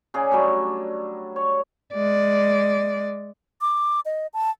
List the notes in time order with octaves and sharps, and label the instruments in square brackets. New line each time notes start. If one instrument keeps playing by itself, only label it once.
[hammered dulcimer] C#3 G#4 D5
F#3 G3 A3 D4
C#5
[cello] G#3 D5
[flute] D6
D#5
A5